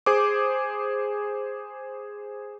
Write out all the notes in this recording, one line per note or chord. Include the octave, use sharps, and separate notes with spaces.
G#4 C5 D6